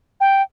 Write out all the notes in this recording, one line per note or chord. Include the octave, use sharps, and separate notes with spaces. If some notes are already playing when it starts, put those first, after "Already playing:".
G5